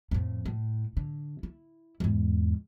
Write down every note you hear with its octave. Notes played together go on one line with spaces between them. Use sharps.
F2 A2
A2
D3
E4
E2 G#2